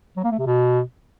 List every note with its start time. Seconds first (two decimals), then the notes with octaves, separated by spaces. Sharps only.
0.17 F#3
0.24 A#3
0.31 A3
0.39 C3
0.46 B2